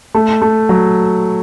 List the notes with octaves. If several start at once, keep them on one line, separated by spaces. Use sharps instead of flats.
A3
A3
F#3